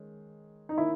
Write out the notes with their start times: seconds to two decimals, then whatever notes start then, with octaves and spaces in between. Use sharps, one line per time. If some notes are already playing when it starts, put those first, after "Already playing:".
Already playing: D#3 G#3 C#4
0.69 D#4
0.78 D#3 A#3 C#4 E4